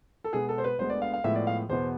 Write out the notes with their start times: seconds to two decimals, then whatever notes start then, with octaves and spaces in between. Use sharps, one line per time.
0.24 A4
0.33 B2 G#3 B3 G#4
0.49 A4
0.58 C5
0.64 B4
0.79 D2 D3 G#3 B3 C5
0.90 D5
1.02 F5
1.14 F5
1.24 A2 F3 G#3 B3 E5
1.35 D5
1.47 F5
1.69 E2 B2 B3 C5